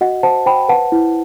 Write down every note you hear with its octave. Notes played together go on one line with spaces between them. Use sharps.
F#4 D#5 F#5
C5 F#5 A5
C5 G5 B5
B4 F#5 A5
E4